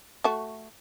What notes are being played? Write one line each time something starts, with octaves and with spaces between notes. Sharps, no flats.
A3 F#4